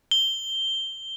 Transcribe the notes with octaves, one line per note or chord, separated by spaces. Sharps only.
G7